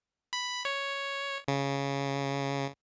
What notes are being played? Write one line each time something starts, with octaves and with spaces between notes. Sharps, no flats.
B5
C#5
C#3